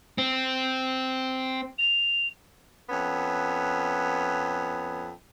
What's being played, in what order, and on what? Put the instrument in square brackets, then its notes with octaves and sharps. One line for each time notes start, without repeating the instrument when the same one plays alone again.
[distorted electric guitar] C4
[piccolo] F7
[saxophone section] F2 B3 C#4